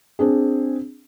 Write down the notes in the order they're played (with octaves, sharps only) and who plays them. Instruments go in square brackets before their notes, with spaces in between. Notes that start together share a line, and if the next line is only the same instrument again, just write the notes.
[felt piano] C4 D4 G#4